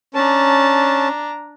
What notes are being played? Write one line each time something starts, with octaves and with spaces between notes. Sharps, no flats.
C#4 D4 A5 A#5